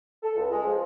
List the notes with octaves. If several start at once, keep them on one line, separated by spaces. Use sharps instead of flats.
A4
C#2
G#3
F3